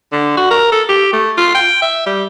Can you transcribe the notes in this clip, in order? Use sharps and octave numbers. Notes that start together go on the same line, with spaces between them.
D3
F#4
A#4
A4
G4
A3
F4
G5
E5
G3